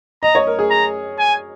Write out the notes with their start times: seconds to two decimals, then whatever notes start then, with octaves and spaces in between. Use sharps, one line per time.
0.23 D#5 A#5
0.35 C#5
0.47 A#4
0.59 G#4
0.70 A#5
1.19 G#5